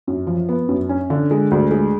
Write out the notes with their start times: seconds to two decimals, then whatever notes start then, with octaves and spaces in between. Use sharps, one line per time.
0.07 F#2
0.27 F3
0.49 B3
0.69 F#2
0.89 C#4
1.10 D3
1.31 G#3
1.51 D2
1.71 G#3